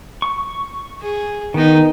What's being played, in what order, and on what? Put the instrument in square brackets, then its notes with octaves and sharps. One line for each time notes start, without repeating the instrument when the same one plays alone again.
[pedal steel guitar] C#6
[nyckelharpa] G#4
[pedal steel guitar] D#3 [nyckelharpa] B3 D#4